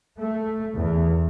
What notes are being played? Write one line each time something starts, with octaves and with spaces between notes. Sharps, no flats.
A3
E2